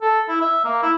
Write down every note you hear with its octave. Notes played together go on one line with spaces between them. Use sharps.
A4
E4
E5
A#3
E4